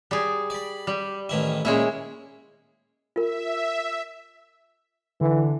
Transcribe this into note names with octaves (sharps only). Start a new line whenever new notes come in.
G3 G#4
D5 B5
G3
A1 D#3 E4
A#2 G#3 C#4 E4
F4 A#4 E5
D3 E3